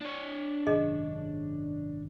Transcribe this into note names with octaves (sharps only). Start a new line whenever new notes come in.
D4 C#5
G#1 F#2 C3 G#4 D#5